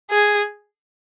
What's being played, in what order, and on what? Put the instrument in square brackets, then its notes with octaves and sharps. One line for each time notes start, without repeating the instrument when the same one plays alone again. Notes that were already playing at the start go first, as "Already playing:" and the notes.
[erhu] G#4